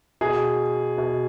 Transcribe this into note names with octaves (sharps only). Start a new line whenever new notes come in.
B2 G#4
B2